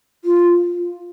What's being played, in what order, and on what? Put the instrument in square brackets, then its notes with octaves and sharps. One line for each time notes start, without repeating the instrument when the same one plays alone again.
[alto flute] F4